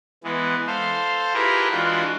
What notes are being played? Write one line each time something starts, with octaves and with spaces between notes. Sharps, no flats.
E3 G#3 B3
A4 C5 F5
E4 F4 G4 G#4 A#4 B4
E3 G#3 D4 F4 F#4